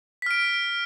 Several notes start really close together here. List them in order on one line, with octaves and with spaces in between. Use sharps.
B6 F6 D7